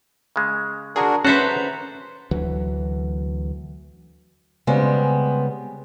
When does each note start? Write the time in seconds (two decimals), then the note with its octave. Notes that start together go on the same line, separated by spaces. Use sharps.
0.36 C#3 G#3
0.96 D4 F#4 G#4 A#4 A#5 C#6
1.25 C#4 F#4 A4 B4 C5 E5 F#5 A#5
2.31 D2 E3 F#3
4.67 C#3 G3 G#3 B3 C4